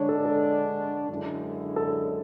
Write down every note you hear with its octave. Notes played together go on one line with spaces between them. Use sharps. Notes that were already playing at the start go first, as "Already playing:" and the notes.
Already playing: D3 G#3 D4 C#5
A4
A4
F#2 D3 G#3 C#4 E4
A4